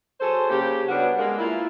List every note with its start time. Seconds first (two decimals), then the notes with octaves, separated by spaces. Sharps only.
0.20 F#3 G#4 A4 C5
0.50 C#3 A#3 G4
0.88 F#3 G3 B3 C#4 D4 F#4
1.18 G#3 A#3
1.38 A#3 E4 F4